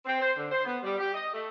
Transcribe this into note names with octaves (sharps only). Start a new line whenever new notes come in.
C4
C5
D3
C5
B3
G3
G4
D#5
A3